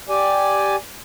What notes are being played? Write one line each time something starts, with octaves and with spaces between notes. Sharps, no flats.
G4 D5 G#5